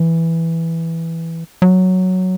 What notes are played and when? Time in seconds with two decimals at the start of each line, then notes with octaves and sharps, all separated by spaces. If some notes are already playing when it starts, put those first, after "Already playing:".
Already playing: E3
1.62 F#3